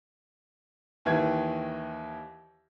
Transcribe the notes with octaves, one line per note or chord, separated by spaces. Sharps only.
D#2 D#3 E3 E4 G#6